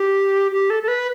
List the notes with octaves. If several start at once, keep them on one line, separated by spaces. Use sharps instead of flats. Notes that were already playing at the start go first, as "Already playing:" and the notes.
Already playing: G4
G4
A4
A4
B4